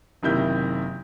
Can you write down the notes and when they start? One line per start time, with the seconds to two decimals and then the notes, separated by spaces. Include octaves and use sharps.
0.23 F#1 C3 D#3 E4 E5 G6